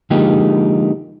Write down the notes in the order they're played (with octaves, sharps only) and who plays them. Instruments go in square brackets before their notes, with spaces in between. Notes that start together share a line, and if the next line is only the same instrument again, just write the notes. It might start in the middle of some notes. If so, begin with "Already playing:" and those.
[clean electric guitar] D3 F3 G#3 A#3 D#4 G4